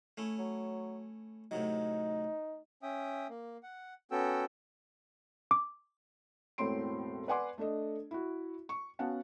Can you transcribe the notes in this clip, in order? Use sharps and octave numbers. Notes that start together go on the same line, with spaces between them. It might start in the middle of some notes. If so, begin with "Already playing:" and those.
A3 C#4 E4
F#3
A2 C3 F#3 D#4
C#4 E5 G5 D#6
A#3
F#5
B3 C#4 F#4 A4 G5 E6
D6
E1 A2 C4 C#5 C6 D7
B4 D5 F#5 G#5 C6 D6
A3 D4 A4 D#5
E4 F#4
C#6
B3 C#4 F#4 F5 F#5 A5